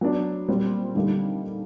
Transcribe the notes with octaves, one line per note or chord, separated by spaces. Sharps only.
F#3 B3 D4
A#2 G3 C4
D3 G3 A#3 D#4